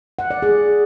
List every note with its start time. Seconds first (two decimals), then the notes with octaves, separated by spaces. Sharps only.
0.19 F#5
0.31 D5
0.42 G#4